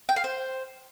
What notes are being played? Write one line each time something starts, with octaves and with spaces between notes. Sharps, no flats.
G5
F5
C5